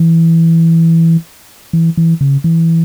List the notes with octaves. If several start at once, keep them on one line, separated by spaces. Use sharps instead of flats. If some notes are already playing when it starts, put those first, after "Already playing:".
Already playing: E3
E3
E3
C#3
E3